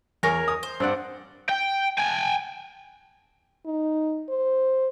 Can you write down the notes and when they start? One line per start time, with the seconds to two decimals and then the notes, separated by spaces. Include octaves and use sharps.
0.23 E2 A#4 C#5 G#5
0.48 D#6
0.63 C5
0.80 G2 C4 D5 F#5
1.49 G5
1.99 G5 G#5
3.66 D#4
4.29 C5